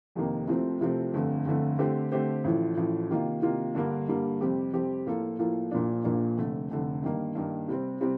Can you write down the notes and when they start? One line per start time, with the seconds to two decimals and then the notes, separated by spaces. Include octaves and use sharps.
0.15 F1 F2 C3 D#3 A#3
0.47 C2 C3 F3 A3 C4
0.80 C2 C3 F3 A3 C4
1.14 G1 F2 D3 A3
1.46 G1 F2 D3 A3
1.79 D3 A3 C4 G4 C5
2.12 D3 A3 C4 G4 C5
2.44 A1 A2 F3
2.77 A1 A2 F3
3.10 C3 D#3 A#3 F4
3.42 C3 D#3 A#3 F4
3.75 G2 D3 G3 A#3
4.08 G2 D3 G3 A#3
4.41 F2 C3 G3 C4 G4
4.73 F2 C3 G3 C4 G4
5.06 A2 F3 A#3 F4 A4
5.39 A2 F3 A#3 F4 A4
5.71 A#1 A#2 F3 A#3 D4
6.04 A#1 A#2 F3 A#3 D4
6.37 F1 F2 D3 A3
6.71 F1 F2 D3 A3
7.03 G2 D#3 A#3
7.35 G2 D#3 A#3
7.68 C3 G3 C4
8.01 C3 G3 C4